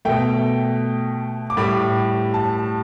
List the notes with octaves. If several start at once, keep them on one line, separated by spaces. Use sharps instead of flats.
B2 A3 G5
D6
A2 G3 B5
A5